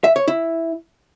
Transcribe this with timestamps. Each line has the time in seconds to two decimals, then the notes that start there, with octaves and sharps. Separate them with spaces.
0.04 E5
0.16 C#5
0.28 E4